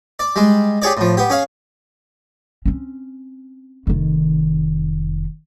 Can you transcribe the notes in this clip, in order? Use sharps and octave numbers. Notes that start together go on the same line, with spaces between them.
D5
G3 G#3
G4 G#4 C#5 D5
A2 F3
B3 G4
C#4 G#4 F5
C4 C#4
F1 D#3